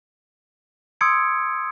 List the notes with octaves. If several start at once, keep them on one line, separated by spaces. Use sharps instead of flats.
C6 D#6 E6 G#6 C#7 D7